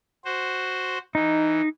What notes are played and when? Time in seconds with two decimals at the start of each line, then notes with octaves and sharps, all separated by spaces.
0.25 F#4 C5
1.15 E3 D#4